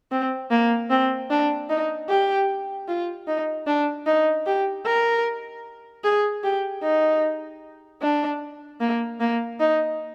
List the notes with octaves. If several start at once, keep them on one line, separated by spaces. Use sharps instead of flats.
C4
A#3
C4
D4
D#4
G4
F4
D#4
D4
D#4
G4
A#4
G#4
G4
D#4
D4
A#3
A#3
D#4